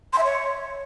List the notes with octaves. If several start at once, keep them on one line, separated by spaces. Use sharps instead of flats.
C6
E5
C#5